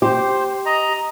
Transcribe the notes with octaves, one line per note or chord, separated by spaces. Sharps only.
G4 C5
D#5 A#5